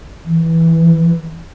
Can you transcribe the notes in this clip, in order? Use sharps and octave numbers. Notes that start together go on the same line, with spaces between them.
E3